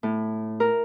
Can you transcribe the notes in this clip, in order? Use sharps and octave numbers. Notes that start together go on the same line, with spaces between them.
A2
A#4